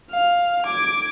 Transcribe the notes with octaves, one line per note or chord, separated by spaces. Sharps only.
F5
D6 G#6